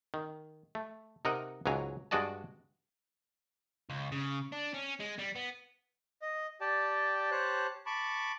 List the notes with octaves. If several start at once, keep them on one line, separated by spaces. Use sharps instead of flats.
D#3
A3
C3 D#4 A#4 D#5 F#5
C#2 G#2 F#3 G#5 A#5
G2 G#3 F#4 D5 D#5 A5
C#2
C#3
D4
C#4
G#3
G3
B3
D#5
G4 D5 G5 A5
G4 C5 C#5 A5 F#6
A5 B5 C#6 D6